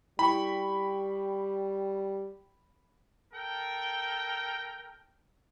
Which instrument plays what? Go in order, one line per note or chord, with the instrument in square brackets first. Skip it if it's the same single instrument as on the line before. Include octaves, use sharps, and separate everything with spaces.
[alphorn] G3 [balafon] E4 [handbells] G5 C#6 [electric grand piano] B5
[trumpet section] A4 A#4 G5